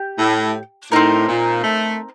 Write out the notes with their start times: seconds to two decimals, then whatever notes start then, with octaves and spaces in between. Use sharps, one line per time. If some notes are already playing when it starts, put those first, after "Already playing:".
Already playing: G4
0.19 A2
0.92 A2 C4 D#4 A#4
1.29 A#2
1.64 A3